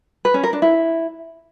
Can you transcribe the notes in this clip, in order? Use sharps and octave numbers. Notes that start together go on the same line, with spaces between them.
B4
C#4
A#4
D4
E4